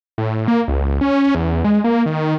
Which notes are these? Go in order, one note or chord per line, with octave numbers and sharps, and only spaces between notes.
A2
A#3
C#2
C#4
E2
G#3
A#3
D#3